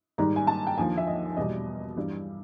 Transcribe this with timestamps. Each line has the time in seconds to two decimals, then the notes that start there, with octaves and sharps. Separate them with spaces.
0.18 G#2 D#3 G3 A#5
0.36 G#5
0.47 A5
0.67 G5
0.78 D#2 D3 F3 G#5
0.97 E5
1.07 D#5
1.36 E2 B2 G3 D#5
1.96 G2 E3 G3